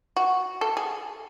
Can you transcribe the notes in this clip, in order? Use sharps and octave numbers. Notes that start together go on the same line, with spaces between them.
F#4
A4
G#4